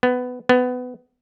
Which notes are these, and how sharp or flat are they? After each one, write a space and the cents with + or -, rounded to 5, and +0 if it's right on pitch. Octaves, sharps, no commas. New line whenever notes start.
B3 +15
B3 +20